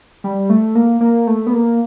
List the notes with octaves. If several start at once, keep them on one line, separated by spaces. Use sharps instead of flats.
G3
A3
A#3
A#3
A3
B3
A#3